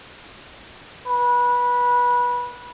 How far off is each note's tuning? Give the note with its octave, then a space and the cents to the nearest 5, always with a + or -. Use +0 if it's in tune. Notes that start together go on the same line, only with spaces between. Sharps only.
B4 -20